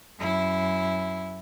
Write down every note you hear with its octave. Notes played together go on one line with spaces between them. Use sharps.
F#2 E4